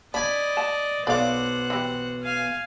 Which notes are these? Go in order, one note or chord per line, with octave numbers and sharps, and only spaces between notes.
D4 D5 D#5 G#5 B5
A5
B1 C5 D5 F5 F#5 D6
E3 G4
F5 G#5